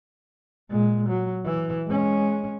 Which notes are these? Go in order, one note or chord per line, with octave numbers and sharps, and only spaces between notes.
A#2 G#3
F#3
E3 E4
G#3 C#4